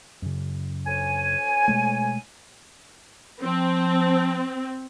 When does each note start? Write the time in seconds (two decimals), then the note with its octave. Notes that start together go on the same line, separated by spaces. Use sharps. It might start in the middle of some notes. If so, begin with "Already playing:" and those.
0.22 F#2 C#3
0.86 D2 C#5 G#5
1.68 B2 G#3 A3
3.42 F3 C4